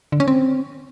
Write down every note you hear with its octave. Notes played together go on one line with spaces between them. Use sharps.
D3
C#4
C4